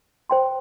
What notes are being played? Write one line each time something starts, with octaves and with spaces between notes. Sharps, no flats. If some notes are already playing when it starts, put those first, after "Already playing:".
C5 G5 C6